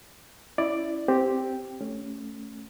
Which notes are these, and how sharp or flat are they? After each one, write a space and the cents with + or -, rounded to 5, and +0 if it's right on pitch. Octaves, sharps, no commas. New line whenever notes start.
C#4 +0 E4 +0 D5 +5
C4 +0 G4 +0
A3 +0 C#4 +0